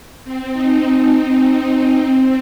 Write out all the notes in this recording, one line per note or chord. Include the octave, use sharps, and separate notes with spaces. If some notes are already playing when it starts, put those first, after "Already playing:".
C4
D#4
C4
C4
D#4
C4